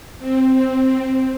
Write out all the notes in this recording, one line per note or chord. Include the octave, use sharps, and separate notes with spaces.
C4